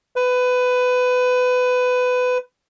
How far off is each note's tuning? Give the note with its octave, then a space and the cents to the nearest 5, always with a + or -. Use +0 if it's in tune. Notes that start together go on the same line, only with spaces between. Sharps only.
B4 +20